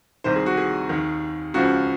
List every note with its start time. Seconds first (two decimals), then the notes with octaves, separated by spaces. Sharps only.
0.24 C2 C3 D#3 C5
0.36 G#4
0.46 F#4
0.57 G#4
0.89 D#2 D#3
1.54 C#2 C#3 F3 F#4